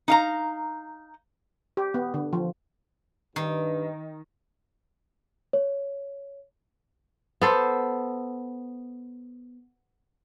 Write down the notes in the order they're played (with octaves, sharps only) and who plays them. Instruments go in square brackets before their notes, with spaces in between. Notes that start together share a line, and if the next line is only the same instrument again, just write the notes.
[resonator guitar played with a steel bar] D#4 F5 A#5
[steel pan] G4
B3
D3
F3
[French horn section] G2 B4 [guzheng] D#3
[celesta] C#5
[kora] B3 A4 C5